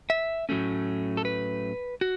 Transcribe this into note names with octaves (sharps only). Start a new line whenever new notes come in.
E5
A2 F#3 A3 C#4
A4
B4
F#4